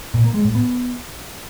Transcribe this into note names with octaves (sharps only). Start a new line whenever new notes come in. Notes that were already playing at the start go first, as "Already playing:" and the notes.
A#2
A#3
G#3
A2
B3